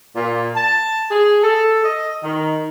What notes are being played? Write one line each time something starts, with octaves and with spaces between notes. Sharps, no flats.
A#2
A5
G#4
A4
D#5
D#3